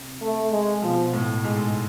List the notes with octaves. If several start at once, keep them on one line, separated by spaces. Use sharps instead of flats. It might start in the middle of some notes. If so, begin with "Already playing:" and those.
Already playing: C3
A3
G#3
B2 F3
A2
G#2 G#3